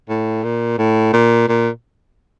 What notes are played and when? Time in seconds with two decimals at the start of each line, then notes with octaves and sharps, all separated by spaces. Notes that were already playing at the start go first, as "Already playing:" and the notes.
0.09 A2
0.43 A#2
0.78 A2
1.13 A#2
1.48 A#2